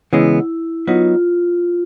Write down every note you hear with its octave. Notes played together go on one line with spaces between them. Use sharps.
C#3 E3 G#3 B3 E4
F#3 B3 D#4 F4